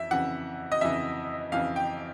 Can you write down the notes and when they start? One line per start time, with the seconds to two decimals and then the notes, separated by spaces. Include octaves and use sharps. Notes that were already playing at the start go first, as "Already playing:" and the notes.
Already playing: F2 E3 E5
0.11 F2 C#3 E3 F#5
0.72 D#5
0.81 F2 C#3 E3 E5
1.52 F2 C#3 E3 F5
1.76 G5